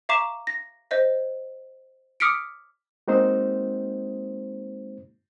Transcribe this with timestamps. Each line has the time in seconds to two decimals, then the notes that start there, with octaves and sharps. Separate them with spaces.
0.09 E5 F5 A#5 C#6 D6 E7
0.47 A#6
0.91 C5 D#5 E5
2.20 D6 D#6 F6 B6 C#7 D7
3.08 G#3 A#3 C4 D#4 F#4 C5